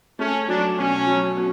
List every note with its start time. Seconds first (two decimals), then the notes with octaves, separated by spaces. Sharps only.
0.19 A3 C#4
0.48 F#3 D4
0.78 B2 C#4
1.07 F#3
1.37 B2